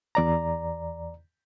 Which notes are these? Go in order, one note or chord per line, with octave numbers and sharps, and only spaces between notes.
E2 D5 A#5